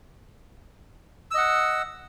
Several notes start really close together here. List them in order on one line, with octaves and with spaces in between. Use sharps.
E6 D#5 F#5